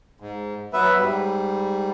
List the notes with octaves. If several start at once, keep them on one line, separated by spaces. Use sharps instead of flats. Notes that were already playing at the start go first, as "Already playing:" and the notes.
G#2
F#3 B3 B4 E5
G#2 G3